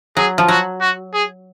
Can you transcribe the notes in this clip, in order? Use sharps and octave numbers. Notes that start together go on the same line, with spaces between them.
F#3 G#4
F3
F#3 F#4
F#4
G#4